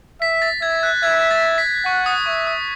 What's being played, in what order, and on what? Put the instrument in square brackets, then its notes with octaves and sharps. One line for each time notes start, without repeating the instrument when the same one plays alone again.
[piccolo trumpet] E5 [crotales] B6
[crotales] A6
[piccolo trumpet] E5 [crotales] G#6
[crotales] F#6
[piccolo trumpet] E5 [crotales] G#6
[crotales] A6
B6
[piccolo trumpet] F#5 [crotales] C#6
[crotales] D#6
[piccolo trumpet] E5 [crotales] C#6
[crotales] D#6